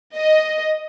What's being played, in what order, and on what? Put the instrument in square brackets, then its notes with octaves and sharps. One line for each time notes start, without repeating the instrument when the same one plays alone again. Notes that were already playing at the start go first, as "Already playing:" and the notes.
[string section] D#5